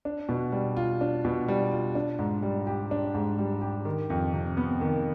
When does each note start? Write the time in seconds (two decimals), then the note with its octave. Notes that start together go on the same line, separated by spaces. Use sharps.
0.05 D4
0.29 B2
0.52 G3
0.77 F4
1.01 D4
1.25 B2
1.48 G3
1.72 F4
1.95 D4
2.19 G#2
2.42 G3
2.67 G4
2.91 D4
3.15 G#2
3.39 G3
3.62 G4
3.85 D#3
4.10 F2
4.33 C3
4.57 B3
4.81 D#3